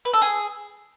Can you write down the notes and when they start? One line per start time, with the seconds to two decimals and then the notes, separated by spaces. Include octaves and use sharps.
0.05 B4
0.13 A4
0.22 G#4